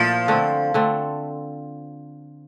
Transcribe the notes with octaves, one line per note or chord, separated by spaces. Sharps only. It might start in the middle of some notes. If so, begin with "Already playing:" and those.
Already playing: A#2 F3 A3 E4
D3 A3 C4
D3 A3 C4